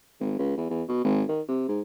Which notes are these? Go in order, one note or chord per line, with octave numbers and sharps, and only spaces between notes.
G#1
C#2
E2
E2
B2
G#1
D#3
C3
G#2